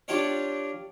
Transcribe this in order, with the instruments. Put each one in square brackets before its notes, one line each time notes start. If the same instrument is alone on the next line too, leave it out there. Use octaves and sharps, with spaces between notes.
[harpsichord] D4 F4 G4 C#5 D5